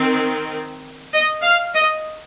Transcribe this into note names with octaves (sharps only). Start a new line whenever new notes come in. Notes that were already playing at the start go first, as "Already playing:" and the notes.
Already playing: D#3 C4
D#5
F5
D#5